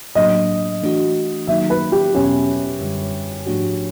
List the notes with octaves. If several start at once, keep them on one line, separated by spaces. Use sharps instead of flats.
A2 F#3 A#3 D4 D#5
E3 A3 D4 F#4
D#3 F#3 A#3 D#4 F#4 E5
B4
G4
E2 B2 F#3 B3 C#4
F#2 D3 G3
G#2 F3 A3 D4 F#4